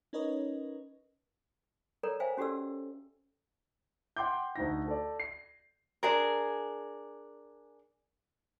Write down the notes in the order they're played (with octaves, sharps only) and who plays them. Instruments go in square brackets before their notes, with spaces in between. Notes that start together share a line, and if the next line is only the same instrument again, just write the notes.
[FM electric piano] C#4 D#4 A#4 B4 C#5 D#5
[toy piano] A4 A#4 C#5 D5 A#5
C5 E5 F5 G5 G#5
C#4 F#4 G4 A4 D5 E6
[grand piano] F#5 G5 C6 D6 G6
D2 D#4 A#6
A4 D5
C7
[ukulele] D4 G#4 A#4